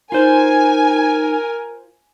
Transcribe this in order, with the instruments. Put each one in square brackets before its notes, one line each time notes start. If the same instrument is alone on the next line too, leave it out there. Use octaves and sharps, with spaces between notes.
[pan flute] D#4 [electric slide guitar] F4 C5 [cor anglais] A#4 [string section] G#5